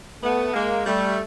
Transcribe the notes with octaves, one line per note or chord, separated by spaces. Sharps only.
A3 B3
G#3 A#3
G3 A3